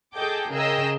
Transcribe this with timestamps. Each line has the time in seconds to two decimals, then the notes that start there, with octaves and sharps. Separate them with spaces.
0.15 G#4 A4 D#5 G5 D6 G6
0.51 C#3 G#4 A#4 D#5 G5 E6